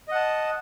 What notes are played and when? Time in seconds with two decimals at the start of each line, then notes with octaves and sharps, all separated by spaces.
0.08 D#5
0.12 F#5
0.15 A5